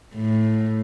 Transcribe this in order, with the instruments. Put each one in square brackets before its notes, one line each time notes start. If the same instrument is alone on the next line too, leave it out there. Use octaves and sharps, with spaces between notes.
[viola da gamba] A2